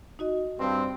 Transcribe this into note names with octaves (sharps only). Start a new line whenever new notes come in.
D#4 F#4 D#5
G2 C4